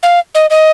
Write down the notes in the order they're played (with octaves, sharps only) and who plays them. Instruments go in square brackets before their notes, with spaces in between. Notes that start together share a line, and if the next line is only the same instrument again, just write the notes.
[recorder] F5
D#5
D#5